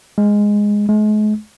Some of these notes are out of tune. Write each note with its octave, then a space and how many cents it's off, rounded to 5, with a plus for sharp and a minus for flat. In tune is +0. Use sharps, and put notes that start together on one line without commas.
G#3 -5
G#3 +40